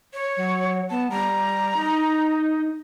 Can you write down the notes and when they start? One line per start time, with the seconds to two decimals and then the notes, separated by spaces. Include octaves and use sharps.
0.14 C#5
0.37 F#3
0.90 B3 A5
1.10 G3 A#5
1.76 D#4